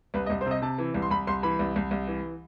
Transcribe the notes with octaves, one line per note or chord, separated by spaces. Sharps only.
C2 B4
D#5
C2
C5
C3
D#5
C3 A5
E3
C2
C6
C2 B5
C2 C6
E3 B5
C2
C2
C2
E3